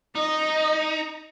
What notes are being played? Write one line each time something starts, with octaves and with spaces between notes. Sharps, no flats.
D#4 D#5